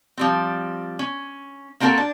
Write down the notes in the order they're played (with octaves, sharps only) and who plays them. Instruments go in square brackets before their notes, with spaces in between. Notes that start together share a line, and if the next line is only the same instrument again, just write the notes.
[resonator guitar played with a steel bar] F3 G3 C4
C#4
A#3 C4 D4 F#4 A4 A#4
D4